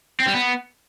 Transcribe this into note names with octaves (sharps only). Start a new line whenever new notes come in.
C4
G3
B3